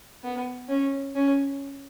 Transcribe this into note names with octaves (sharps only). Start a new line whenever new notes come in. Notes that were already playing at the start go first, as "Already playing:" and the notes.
B3
C#4
C#4